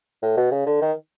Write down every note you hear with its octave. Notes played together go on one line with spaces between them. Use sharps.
A2
B2
C#3
D3
D#3